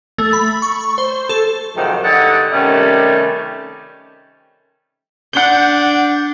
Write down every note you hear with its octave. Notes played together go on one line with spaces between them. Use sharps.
A3
B5
C#6
C5
A4
F2 G#2 C3 D#3 F#3
G2 D3 D#4 D5 F#5
C3 D#3 G3 A3 C#4
D4 F#5 G6